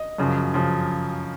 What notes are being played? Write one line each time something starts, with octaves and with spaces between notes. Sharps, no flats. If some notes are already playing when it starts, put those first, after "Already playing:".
Already playing: D#5
F#2 C#3 F3
C#3 F3